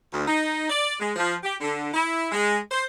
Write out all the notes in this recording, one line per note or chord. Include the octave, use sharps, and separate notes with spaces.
D2
D#4
D5
G#3
F3
G4
D3
E4
G#3
C5